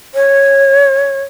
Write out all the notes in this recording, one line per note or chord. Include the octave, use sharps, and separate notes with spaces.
C#5